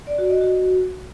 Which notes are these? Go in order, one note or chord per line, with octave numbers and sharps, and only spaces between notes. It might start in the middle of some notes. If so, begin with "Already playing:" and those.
D5
F#4
D#5
F#4